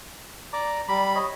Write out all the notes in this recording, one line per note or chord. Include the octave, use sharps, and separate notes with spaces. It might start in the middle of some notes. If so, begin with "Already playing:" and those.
D5 A#5 D6
G3 A#5 B5 D6
C#5 D#5